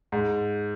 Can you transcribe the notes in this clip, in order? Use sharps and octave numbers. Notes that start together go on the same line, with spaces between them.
G#2